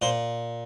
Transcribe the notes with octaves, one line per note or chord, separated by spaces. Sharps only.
A#2 C5